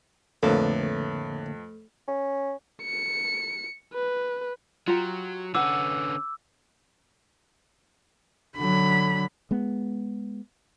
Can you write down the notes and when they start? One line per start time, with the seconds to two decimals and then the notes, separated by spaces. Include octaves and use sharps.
0.43 F2 A2 D3 A3 A#3 A4 B4
2.08 C#4
2.83 C#7
3.93 B4
4.87 F#3 F4 G4 A#5
5.55 D3 C#4 B4 F#5 D6 E6
8.58 D3 F#3 B5
9.51 G#3 B3